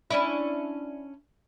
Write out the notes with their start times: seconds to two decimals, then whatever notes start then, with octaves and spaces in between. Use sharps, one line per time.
0.10 C#4 D4 E4